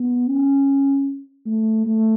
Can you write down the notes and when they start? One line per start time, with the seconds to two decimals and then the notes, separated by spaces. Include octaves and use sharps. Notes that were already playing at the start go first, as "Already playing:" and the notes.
Already playing: B3
0.28 C#4
1.46 A3
1.86 A3